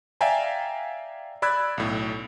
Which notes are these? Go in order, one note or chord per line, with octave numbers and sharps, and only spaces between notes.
D5 E5 F5 G5 G#5 A#5
D5 B5 E6 F#6 G#6
B1 A2